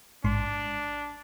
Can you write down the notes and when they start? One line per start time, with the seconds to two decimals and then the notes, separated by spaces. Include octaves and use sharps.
0.24 A1 G#2 D4 C6